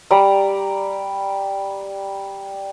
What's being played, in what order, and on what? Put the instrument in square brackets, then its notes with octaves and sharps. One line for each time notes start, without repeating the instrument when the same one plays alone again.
[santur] G3 D5 A#5